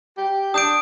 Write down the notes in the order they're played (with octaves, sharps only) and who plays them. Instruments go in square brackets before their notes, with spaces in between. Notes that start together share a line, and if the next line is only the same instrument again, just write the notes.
[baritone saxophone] G4
[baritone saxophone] D4 [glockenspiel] D#6 G6 D7